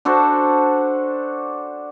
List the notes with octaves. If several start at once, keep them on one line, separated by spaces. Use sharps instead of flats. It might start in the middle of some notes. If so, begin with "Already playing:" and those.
D4 F#4 A4 C5